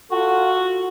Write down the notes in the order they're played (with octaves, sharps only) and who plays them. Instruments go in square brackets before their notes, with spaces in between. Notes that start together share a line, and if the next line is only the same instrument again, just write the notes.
[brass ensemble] F4 A4 F#5 [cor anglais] F#4